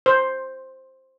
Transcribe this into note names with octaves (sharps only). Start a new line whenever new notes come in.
C5